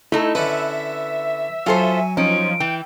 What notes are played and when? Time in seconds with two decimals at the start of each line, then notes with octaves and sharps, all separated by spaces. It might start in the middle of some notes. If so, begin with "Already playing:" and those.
0.12 A3 D#4 E4 A4
0.35 D3 C#4 E4 B4 E5
1.66 F#3 F4 A4 C5 G#5
2.17 F3 C#4 D#4 D7
2.60 E3 G5